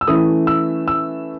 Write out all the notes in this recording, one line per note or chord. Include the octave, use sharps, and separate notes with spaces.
E6
E3 A3 C#4 E4 D#6
E6
E6